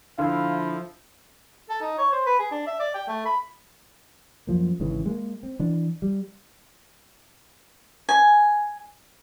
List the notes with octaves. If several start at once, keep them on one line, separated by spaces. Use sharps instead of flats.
D3 F3 E4 F5
A4
D#4
C#5
C5
B4
G#4
D4
E5
D5
G5
A3
B5
F#2 F3 A#3
G#1 G#2 C#3 E3
G#3 A#3
C4
E3 D4
G3
G#5